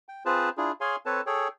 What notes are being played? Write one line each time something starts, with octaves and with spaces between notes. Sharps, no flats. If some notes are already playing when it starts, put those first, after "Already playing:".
G5
C4 F4 G#4 B4 C5 A5
D4 E4 F4 G#4
G#4 C#5 F5 G#5 C6
C4 A4 B4 C#5 A5
G#4 A4 C#5 G5